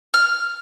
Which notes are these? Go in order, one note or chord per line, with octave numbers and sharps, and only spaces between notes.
F6